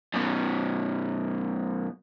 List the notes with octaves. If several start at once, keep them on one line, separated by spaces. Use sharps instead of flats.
F#2 B2